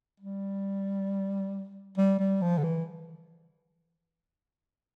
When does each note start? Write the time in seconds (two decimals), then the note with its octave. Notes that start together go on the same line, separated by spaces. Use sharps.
0.20 G3
1.98 G3
2.20 G3
2.42 F3
2.58 D3
2.64 E3